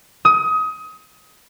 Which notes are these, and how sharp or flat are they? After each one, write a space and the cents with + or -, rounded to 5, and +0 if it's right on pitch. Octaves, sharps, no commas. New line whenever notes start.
D#6 +25